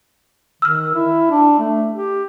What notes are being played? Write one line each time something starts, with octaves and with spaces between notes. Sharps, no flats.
D#3 E6 F6
E4
D4
A3
G4